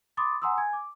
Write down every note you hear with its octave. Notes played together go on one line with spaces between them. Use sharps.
B5 C6 D6 D#6 A6
F#5 G#5 A#5 C6 D#6 E6
G#5 G#6
D6